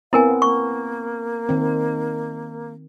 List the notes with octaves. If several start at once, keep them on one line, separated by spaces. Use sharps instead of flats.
B3 C4 E4 A#4 F5 G#5
A#3 C#6
D#3 C4